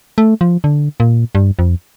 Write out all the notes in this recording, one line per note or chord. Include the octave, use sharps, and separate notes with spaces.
A3
F3
D3
A#2
G2
F2